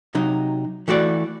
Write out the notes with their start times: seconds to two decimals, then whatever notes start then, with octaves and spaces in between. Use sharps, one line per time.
0.15 C3 F#3 D#4
0.88 E3 A3 F#4 D5